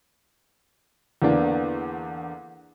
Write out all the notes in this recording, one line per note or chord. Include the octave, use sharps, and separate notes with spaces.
E2 D3 A#3 B3 D4